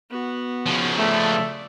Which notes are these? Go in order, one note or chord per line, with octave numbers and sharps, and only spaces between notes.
B3 F#4
C#3 F3
A3 D5